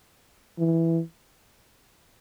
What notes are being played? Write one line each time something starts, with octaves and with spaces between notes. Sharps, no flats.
E3